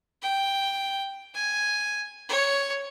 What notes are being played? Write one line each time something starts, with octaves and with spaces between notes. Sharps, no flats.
G5
G#5
C#5